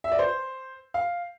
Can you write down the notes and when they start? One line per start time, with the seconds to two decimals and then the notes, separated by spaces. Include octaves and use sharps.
0.04 E5
0.12 D5
0.19 C5
0.94 F5